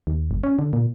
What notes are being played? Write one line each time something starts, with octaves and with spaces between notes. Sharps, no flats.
D#2
G1
C#4
D3
A#2